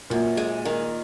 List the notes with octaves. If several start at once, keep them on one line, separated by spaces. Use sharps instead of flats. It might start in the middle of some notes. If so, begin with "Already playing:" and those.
F#2 A#2
G#3
D#3